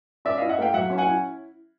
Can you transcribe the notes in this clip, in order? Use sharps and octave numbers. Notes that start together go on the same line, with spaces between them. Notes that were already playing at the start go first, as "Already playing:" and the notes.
C#4 D5 E5
D#5 F5
E4
E5 F#5
A#3 F5 G5
F#3 E5 F#5
C#4
F#5 G#5
E4